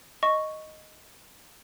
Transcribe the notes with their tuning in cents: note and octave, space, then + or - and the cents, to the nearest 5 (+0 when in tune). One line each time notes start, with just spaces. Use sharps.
D#5 +0 C#6 +0